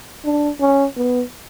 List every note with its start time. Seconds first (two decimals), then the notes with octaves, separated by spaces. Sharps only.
0.25 D4
0.61 C#4
0.97 B3